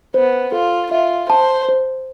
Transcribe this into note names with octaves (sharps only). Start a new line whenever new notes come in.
B3 C5
F4 A4
F4 E5
C5 A5
C5